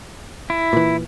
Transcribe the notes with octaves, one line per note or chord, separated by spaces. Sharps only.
E4
A#2 E3